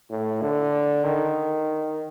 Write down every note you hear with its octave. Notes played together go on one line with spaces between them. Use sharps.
A2
D3
D#3